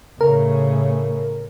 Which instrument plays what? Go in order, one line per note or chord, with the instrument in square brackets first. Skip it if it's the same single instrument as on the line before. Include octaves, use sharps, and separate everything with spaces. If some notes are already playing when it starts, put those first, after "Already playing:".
[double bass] A2 C#3 [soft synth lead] A#4